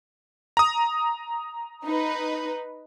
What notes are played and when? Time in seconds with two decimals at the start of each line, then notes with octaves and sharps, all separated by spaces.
0.57 A#5 D#6
1.84 D#4 B4